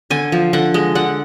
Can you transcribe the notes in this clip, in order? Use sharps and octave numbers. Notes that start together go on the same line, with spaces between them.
D3 G#5
F3
D3 F#5
G#3
D3 F#5